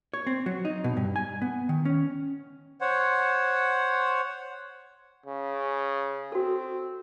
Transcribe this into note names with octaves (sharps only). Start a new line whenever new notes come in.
C#5
C4
F#3
D#4
B2
G2
G#5
B3
D#3
C#4
C5 C#5 F#5
C#3
C4 F#4 A4